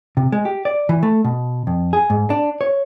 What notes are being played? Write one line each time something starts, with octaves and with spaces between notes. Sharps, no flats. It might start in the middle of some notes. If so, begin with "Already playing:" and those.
C3
G#3
G4
D5
E3
A3
B2
F2
G#4
G#2
D4
C#5